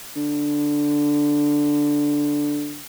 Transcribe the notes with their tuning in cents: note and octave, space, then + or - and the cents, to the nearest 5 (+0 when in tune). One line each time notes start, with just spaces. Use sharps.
D3 +0